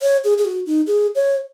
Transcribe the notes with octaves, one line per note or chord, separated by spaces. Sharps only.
C#5
G#4
G#4
F#4
D#4
G#4
C#5